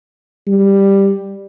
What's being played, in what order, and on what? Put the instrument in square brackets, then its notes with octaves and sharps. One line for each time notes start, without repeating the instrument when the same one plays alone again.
[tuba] G3